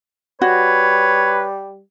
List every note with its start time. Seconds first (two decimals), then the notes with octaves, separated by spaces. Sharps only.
0.42 G3 F#4 B4 C#5